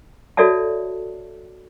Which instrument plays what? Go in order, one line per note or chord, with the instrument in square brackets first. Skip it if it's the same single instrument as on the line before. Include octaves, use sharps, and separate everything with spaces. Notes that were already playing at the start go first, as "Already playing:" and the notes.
[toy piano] F#4 A4 C#5 D5 E5 A5